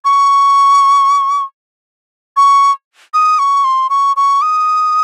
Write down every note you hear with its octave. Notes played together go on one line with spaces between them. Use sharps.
C#6
C#6
D#6
C#6
C6
C#6
C#6
D#6